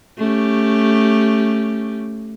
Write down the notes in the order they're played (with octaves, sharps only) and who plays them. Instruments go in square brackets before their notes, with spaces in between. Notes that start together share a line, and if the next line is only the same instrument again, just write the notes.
[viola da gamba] A3 C#4 G4